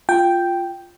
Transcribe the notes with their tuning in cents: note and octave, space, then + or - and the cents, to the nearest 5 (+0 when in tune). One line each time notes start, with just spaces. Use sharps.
F4 +0 G5 +0